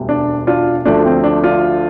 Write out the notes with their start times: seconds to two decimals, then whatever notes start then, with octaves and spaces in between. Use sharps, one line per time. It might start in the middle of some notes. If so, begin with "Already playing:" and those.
Already playing: E1 D2 G3
0.09 D4
0.47 D4 F4
0.85 D2 D3 F3 A3 D4
1.05 C4
1.24 D4
1.43 D4 F4